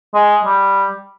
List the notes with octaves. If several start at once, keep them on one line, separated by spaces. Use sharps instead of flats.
G#3
G3